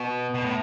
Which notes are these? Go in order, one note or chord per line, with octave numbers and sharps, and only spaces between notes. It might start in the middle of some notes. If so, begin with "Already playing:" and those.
Already playing: B2 B3
B2
A2